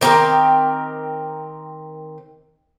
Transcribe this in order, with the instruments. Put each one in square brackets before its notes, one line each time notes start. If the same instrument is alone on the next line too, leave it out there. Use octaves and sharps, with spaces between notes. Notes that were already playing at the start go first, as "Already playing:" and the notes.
[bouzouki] D#3 C4 G4 A#4